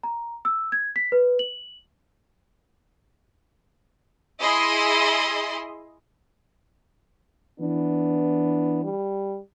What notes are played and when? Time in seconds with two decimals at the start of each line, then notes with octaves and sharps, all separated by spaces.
0.03 A#5
0.45 E6
0.72 G#6
0.96 B6
1.12 B4
1.39 F#7
4.39 E4 G#4 D#5 C6
7.60 E3 B3 D4
8.84 G3